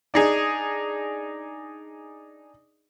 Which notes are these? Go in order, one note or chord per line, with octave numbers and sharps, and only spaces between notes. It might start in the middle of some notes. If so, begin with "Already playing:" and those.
D4 D#4 G#4